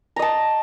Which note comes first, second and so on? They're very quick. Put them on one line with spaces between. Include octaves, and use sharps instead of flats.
A#5 D#5 A5